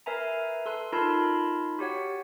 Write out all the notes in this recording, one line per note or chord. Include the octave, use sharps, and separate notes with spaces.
A#4 B4 E5 G#5 A#5
A4 C6 F#6
D#4 F4 A#4 A5 B5 C6
F#4 G4 C#5 F#5